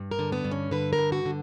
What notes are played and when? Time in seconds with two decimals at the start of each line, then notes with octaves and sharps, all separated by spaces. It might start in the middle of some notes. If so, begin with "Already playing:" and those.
Already playing: G2
0.11 A#4
0.19 D3
0.32 B3
0.45 G2
0.51 C#4
0.71 D3 B4
0.93 A#4
0.99 G2
1.12 F#4
1.26 D3